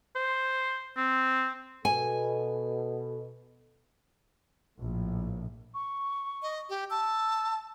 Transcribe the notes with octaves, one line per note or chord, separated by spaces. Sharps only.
C5
C4
B2 A4 G#5
A#1 A2
C#6
D#5
G4
A5 E6